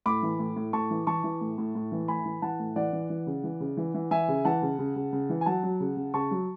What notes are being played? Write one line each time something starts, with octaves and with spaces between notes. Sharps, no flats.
A2 B5 D6
E3
A2
A2
A2 A5 C#6
E3
E3 A5 C#6
E3
A2
A2
A2
E3
A2 G#5 B5
E3
E3 F#5 A5
A2
E3 D5 F#5
E3
E3
C#3
E3
C#3
E3
E3
E3 E5 G#5
C#3
E3 F#5 A5
C#3
C#3
C#3
C#3
E3
G#5
F#3 F#5 A5
F#3
C#3
C#3
C#3 A5 C#6
F#3